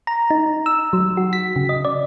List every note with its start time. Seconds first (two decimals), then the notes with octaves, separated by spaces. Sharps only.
0.07 A#5
0.30 D#4
0.66 E6
0.93 F#3
1.17 F#4
1.33 B6
1.56 C#3
1.69 D#5
1.85 D5